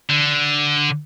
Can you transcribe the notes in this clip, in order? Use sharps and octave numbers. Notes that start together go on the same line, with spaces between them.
D3